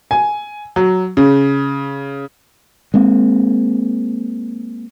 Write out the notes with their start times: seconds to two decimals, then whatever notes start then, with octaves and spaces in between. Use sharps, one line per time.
0.11 G#5
0.76 F#3
1.17 C#3
2.94 G#3 A#3 C4